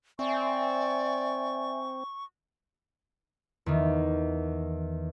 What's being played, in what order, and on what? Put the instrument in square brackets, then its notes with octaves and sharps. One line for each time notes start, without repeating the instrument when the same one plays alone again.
[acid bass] C4 [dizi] D5 [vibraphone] E5 G#5 [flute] C#6
[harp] E2 D#3